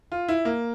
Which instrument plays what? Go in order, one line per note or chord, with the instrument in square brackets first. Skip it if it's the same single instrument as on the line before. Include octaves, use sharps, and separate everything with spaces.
[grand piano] F4
E4
A#3